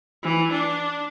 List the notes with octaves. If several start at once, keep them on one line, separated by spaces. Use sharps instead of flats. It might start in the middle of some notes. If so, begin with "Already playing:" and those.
E3
D4